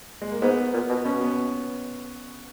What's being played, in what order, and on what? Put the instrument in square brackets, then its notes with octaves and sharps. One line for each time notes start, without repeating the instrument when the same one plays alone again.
[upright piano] G#3
A#3
[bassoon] G#2 [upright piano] B3
[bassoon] A#2
B2
[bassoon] B2 [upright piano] C#4
[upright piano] B3